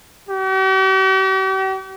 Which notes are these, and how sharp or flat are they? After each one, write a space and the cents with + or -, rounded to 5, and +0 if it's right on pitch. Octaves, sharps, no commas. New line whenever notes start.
G4 -45